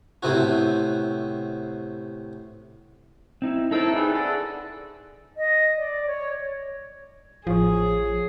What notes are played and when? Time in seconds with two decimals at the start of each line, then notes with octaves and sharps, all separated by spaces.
0.23 A2 C3 B3 C4 F#4
3.42 C4 D#4 E4
3.71 A2 C4 D#4 E4 A4
3.93 G3 A3 B3 G#4
4.14 D3 A4
5.36 D#5
5.77 D5
6.07 C#5
7.47 A1 F3 F4 G#4 C#5